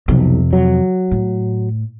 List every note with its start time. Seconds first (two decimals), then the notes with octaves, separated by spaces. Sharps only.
0.08 B1 F2 C3
0.53 F#3
1.11 A2